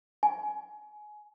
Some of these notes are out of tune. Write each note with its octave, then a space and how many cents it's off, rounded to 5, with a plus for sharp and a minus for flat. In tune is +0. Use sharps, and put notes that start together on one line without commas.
G#5 +20